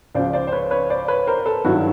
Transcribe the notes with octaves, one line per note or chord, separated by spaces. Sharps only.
C#2 C#3 F3 C5 D5
C5 D5
C5
B4 C#5
B4 C#5
C5 D5
B4 C#5
A#4 C5
A4 B4
G2 D#3 F#3 E4 F#4